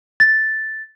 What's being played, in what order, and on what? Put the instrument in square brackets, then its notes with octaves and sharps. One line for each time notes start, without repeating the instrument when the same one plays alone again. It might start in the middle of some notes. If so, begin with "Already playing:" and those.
[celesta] A6